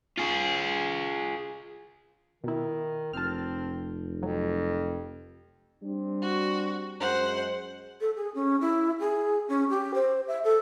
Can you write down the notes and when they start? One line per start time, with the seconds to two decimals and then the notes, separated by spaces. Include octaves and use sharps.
0.18 F4 G#4
2.44 B2 D#3 E4
3.13 F1 C4 A5 F6
4.23 F2 F#3
5.83 G3 C4 D4
6.22 F#4
7.00 F#2 G#3 C5 F#5
8.01 A4
8.16 G#4
8.35 C#4
8.61 E4
9.00 G#4
9.49 C#4
9.70 G4
9.94 C5
10.28 E5
10.44 A4